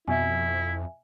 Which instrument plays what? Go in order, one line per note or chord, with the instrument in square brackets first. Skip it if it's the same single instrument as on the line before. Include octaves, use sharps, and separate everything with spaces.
[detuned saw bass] F2 [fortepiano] B2 [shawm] E4 [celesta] E5 G#5